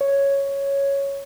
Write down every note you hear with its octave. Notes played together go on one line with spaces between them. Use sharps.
C#5